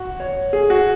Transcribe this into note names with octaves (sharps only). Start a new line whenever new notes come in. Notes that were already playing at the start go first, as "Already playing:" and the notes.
Already playing: F#4
C#5
G#4
F#4